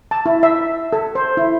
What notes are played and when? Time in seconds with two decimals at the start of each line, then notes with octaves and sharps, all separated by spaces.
0.11 A5
0.26 E4
0.43 E5
0.93 A4
1.15 C5
1.37 E4